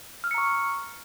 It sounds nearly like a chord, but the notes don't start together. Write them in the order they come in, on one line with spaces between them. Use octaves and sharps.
F6 E6 C#7 A#5 C#6